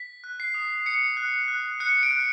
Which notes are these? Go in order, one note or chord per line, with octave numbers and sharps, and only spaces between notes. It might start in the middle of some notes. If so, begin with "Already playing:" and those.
Already playing: B6
F#6
C7
D#6
D#6 C#7
F#6
F#6
F#6 C#7
D7
F#6